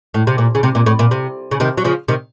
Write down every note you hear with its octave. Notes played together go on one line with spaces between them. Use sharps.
A2
C3
A#2
C#3
C3
A#2
A2
A#2
C3
C#3
C3 D#3
F#3
C#3 F3
C3 D#3